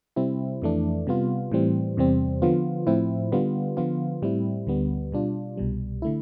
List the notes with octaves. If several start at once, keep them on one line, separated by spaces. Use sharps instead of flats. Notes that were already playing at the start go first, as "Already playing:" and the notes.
C3 G3 C4 E4
F2 E3 A3 D4
C3 G3 B3 F4
A2 E3 G3 C4
E2 C3 G3 C4
D3 F3 B3 F4
A2 F3 C4 E4
D3 G3 B3 F4
D3 F3 B3 F4
A2 G3 C4 E4
D2 D3 G3 B3
B2 G3 D4 F4
C2 B2 G3
D3 A3 E4